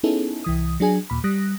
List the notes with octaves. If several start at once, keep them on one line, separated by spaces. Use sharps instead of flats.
B3 C#4 D#4 E4 G#4 A4
C2 E3 D#6
F#3 D4 G#4 G#5
D#2 A#2 B5
G3 D#6 F#6 A#6